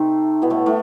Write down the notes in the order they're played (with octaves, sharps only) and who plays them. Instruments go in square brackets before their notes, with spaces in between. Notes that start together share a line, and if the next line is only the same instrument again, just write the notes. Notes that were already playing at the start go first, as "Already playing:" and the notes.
Already playing: [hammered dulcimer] C3 A3 C4 [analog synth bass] D#4
[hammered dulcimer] B2 B3 [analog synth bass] E4
[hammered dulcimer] A2 A3
A2 A3